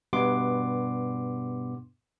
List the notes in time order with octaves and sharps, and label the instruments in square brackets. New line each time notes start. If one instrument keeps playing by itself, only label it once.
[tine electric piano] G2 B2 B3 C6 D6